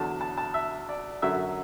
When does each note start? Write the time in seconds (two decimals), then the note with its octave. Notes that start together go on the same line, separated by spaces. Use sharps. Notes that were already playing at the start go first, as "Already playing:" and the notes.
Already playing: E2 D3 F#3 A5
0.21 A5
0.38 A5
0.54 E5
0.89 D5
1.22 F#2 D3 F#3 E5